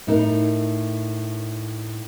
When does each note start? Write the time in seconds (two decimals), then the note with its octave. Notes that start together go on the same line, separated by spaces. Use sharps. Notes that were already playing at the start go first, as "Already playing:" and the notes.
0.07 A2 D#4 A#4